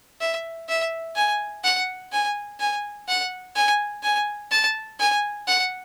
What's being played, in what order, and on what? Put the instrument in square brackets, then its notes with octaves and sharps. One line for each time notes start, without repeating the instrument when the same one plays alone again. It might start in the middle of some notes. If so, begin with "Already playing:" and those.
[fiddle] E5
E5
G#5
F#5
G#5
G#5
F#5
G#5
G#5
A5
G#5
F#5